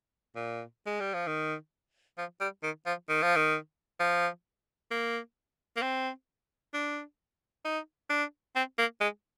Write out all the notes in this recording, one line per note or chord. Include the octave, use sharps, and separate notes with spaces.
A#2
G#3
G3
F3
D#3
F3
G3
D#3
F3
D#3
F3
D#3
F3
A#3
A#3
C4
D4
D#4
D4
C4
A#3
G#3